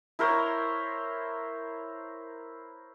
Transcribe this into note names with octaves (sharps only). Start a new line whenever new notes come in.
E4 A#4 C5 C#5